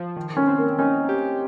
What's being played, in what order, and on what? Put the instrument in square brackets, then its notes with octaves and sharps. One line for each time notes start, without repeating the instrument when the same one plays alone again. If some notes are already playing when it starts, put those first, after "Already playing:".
Already playing: [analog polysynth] F3
D#3
[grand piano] C#4
[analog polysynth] C4
[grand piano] A#3
[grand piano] C#4 [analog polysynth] D#4
[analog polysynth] G4